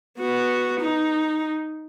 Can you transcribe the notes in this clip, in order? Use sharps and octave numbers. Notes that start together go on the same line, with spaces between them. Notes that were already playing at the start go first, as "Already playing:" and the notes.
B3 F#4
D#4